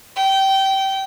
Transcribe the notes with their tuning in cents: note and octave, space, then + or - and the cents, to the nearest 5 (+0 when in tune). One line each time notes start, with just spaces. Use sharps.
G5 -20